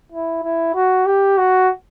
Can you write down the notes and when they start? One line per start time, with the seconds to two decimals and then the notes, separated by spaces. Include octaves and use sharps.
0.12 E4
0.43 E4
0.75 F#4
1.06 G4
1.37 F#4